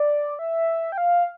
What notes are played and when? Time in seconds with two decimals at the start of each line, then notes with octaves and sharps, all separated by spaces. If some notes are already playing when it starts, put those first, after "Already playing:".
Already playing: D5
0.39 E5
0.92 G5
0.98 F5